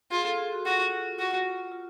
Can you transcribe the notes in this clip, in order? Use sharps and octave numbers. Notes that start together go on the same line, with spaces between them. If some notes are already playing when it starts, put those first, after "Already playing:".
F4 G#4
A4
G#4
F#4
F4 F#4
F4 F#4
F4